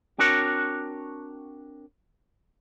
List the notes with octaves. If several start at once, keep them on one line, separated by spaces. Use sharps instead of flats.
C4 D4 F#4 A#4 C#5